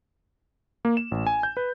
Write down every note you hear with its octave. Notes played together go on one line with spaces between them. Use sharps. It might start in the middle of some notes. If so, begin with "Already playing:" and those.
A#3
E7
A1
G#5
G6
B4